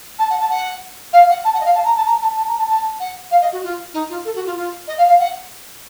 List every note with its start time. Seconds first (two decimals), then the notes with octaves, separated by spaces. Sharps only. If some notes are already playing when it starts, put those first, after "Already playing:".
0.19 A5
0.30 F#5
0.40 A5
0.50 F#5
1.13 F5
1.29 F#5
1.45 A5
1.54 F#5
1.60 D#5
1.65 F5
1.75 A5
1.85 A#5
1.97 A5
2.06 A#5
2.22 A5
2.37 A5
2.48 A#5
2.59 A5
2.69 A5
3.00 F#5
3.31 F5
3.41 D#5
3.52 F#4
3.63 F4
3.94 D#4
4.10 F4
4.25 A4
4.35 F#4
4.46 F4
4.56 F4
4.88 D#5
4.98 F5
5.08 F5
5.19 F#5